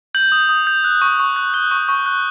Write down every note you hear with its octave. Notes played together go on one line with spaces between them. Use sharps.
G6 F#7
D#6
D#6
G6
F#6
C#6
C#6
F#6
F#6 G7
C#6
C#6
F#6